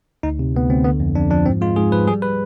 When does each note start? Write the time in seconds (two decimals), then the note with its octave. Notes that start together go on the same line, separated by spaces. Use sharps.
0.23 D2 D#4
0.39 C3
0.54 D2 B3
0.69 D2 C4
0.84 D3 B3
1.00 F2
1.15 F2 D4
1.30 F3 D4
1.46 G#2 C4
1.61 G#3 F4
1.76 G#2 G#4
1.92 F3 B4
2.07 G3 G#4
2.22 G3 B4